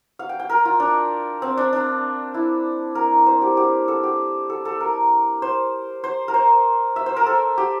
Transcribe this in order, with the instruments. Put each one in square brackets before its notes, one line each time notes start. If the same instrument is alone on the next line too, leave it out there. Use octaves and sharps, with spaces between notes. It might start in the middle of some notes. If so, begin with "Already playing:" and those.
[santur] F5
G5
G5
A#4
F4
D4
C4
D4
D4
E4
A#4
C5
G4
G4
A4
G4
A4
A4
A#4
C5
C5
A#4
C5
E5
C5
A#4
A4
G4